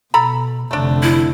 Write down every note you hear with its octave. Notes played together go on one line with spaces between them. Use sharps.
B2 A4 A#5 B5
F1 D3 A3 D4
E4